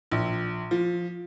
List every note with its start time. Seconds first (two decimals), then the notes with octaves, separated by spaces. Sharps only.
0.12 A#1
0.71 F3